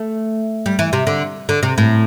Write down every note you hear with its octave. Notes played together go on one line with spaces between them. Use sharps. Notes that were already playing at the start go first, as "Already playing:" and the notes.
Already playing: A3
G3
E3
C3
D3
D3
C3
A2